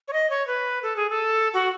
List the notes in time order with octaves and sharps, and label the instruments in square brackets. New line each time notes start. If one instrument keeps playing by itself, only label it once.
[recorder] C#5
D#5
C#5
B4
A4
G#4
A4
F#4